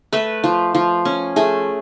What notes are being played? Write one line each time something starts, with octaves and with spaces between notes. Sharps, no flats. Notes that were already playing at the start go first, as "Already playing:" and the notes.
A3 B4
F3
F3
C#4
A3 G#4